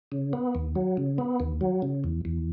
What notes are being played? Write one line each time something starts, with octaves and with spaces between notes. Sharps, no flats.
C#3
B3
D#2
F#3
C#3
B3
D#2
F#3
C#3
E2
E2